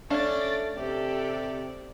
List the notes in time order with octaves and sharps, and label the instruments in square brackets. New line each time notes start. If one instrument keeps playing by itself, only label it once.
[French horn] A3 [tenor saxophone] C#4 [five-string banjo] D4 F5 [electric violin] D5 A6
[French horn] C3 [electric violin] G4 A4 [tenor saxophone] D5